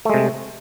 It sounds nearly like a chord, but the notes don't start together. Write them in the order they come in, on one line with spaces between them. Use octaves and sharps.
A3 G#3 C3